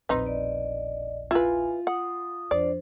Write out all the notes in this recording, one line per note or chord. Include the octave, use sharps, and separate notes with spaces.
E1 A#1 C4 D#4 B4
D5 D#5
E4 F4 B4 G#5
F#5 D#6
F2 D4 C5 D5